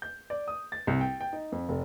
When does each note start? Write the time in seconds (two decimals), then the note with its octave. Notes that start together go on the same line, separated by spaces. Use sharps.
0.02 G6
0.30 D5
0.48 D#6
0.72 A6
0.87 C2
1.01 G5
1.21 G5
1.33 D#4
1.52 F2
1.69 F1